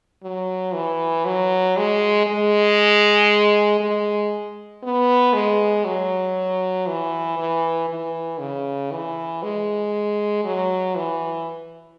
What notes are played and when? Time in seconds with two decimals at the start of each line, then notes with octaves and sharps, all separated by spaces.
0.23 F#3
0.74 E3
1.25 F#3
1.77 G#3
2.27 G#3
3.80 G#3
4.83 B3
5.34 G#3
5.85 F#3
6.87 E3
7.38 E3
7.89 E3
8.40 C#3
8.92 E3
9.43 G#3
10.45 F#3
10.96 E3